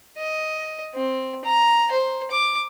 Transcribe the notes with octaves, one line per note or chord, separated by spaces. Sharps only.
D#5
C4
A#5
C5
D6